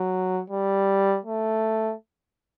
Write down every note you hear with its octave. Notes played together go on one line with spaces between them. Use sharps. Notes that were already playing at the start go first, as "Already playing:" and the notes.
Already playing: F#3
G3
A3